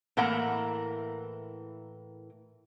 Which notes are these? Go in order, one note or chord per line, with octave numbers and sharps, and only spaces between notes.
A2 E3 A#3 A#4 F#5 A#5